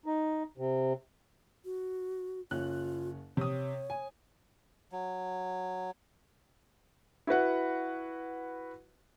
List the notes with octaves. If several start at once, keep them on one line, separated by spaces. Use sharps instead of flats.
D#4
C3
F#4
F#1 C#4 F4 F#6
C3 C#5 D#6
G#5
F#3
E4 F#4 B4 F#5